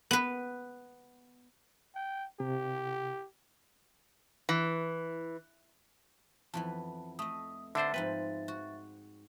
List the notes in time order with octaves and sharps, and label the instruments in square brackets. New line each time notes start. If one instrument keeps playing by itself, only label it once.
[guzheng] B3 B4
[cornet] G5
[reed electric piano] C3 [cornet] G4
[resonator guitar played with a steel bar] E3
[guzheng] F2 E3 B3 [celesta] A5
[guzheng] A3 D#5 [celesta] D#6
[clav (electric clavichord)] D3 D4 C5 [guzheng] A4 B4 F#5 [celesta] E5 A6
[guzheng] G#2 F3 C4 [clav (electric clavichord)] B4
[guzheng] F#4